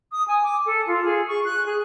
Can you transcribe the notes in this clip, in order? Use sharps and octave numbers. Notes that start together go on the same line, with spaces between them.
D#6
G#5
D6
A4
F4
G#4
C#6
F#6
G#4